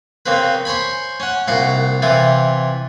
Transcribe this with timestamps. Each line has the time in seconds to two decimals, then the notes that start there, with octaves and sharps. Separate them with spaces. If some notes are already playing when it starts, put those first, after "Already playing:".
0.26 C#3 A#3 C4 B4
0.65 C5 C#5 G#5 B5
1.20 C#4 F#5
1.48 C2 A#2 F5 F#5 A#5
2.02 C3 E3 E4 F4